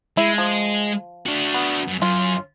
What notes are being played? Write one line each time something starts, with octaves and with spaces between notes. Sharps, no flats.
G#3 E4
F3
D4 F#4
B3
F#2
F#2 F4